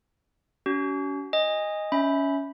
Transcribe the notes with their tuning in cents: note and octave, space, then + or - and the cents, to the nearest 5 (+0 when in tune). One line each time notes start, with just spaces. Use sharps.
C#4 +30 F#4 +40
D#5 +0 G#5 -25
C#4 +15 E5 -20 B5 +0